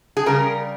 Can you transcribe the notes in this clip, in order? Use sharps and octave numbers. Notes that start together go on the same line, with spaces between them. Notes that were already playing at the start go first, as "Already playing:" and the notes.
G#4
C#3 G3 A#4